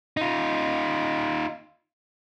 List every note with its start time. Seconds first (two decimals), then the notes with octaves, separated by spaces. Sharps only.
0.17 D#4 F4